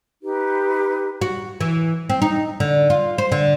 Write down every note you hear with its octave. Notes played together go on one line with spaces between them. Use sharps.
D#4 G4 B4
F#4
E3
C4
D#4
D3
F4
C5
D3